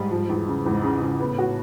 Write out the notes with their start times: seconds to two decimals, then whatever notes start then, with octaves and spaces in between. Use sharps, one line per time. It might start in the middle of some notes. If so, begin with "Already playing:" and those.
Already playing: G#2 G3
0.11 F3
0.29 E2
0.48 C#3
0.66 E2 G#2
0.83 C#3
1.02 C#3
1.20 A2 B3
1.38 F#4